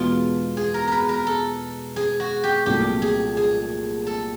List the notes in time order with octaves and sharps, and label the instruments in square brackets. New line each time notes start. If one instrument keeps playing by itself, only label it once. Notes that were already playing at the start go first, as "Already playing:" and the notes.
Already playing: [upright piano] E2 B2 G#3 B3 [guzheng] F4
[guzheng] G#4
A#4
A#4 B4
A#4
A4
G#4
F#4
G4
[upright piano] C2 A#2 F#3 A3 [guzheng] G4
[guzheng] G#4
G#4
A4